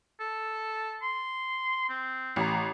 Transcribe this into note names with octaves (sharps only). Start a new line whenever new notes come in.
A4
C6
C4
A1 A#5